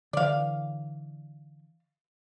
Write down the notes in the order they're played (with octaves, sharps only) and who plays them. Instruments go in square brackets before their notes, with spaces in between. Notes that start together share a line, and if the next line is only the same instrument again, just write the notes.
[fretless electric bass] D3 E3 [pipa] D5 F5